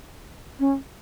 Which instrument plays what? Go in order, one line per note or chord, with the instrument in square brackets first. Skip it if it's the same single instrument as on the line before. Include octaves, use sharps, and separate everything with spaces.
[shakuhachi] C#4